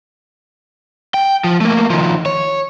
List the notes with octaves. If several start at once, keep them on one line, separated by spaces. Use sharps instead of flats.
G5
F3
A3 A#3
D#3 F3
C#5